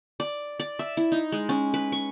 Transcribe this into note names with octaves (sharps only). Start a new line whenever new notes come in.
D5
D5
E5
E4
D#4
G#3
C#4
B4
C#6